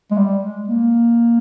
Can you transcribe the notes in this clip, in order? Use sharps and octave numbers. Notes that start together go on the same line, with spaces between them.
G#3
G3
G#3
A#3